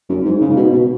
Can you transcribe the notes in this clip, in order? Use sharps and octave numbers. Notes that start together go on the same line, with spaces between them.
F#2
G#2
C#3
G#2
B2
B2